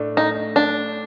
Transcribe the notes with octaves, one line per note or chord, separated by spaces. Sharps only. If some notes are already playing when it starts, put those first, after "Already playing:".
Already playing: A2 A3 D4
D#4
D4